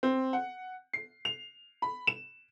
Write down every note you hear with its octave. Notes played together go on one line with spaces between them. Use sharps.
C4
F#5
C7
F7
B5
E7